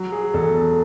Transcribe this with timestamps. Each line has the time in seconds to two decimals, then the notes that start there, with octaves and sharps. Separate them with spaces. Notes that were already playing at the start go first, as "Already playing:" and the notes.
Already playing: F#3
0.12 G#4
0.34 E2 A4
0.55 A4